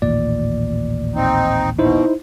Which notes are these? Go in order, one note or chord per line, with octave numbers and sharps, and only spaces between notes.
A1 D#2 A#2 D5
C4 D#4
B2 D#4 E4 C5